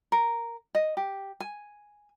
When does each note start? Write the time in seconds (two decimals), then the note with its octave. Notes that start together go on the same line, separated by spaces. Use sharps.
0.12 A#4
0.75 D#5
0.97 G4
1.40 G#5